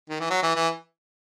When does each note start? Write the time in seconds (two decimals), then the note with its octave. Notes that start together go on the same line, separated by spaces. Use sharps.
0.10 D#3
0.20 E3
0.30 F#3
0.43 E3
0.56 E3